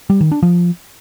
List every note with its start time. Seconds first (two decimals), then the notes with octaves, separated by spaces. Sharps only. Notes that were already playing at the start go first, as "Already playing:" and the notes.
0.10 G3
0.21 D#3
0.32 D4
0.42 F3